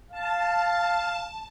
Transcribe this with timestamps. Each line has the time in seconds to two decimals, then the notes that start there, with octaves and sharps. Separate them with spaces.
0.12 F5 A5